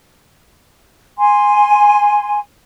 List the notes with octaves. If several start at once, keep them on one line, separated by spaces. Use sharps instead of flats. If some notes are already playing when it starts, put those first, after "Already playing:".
G#5 C6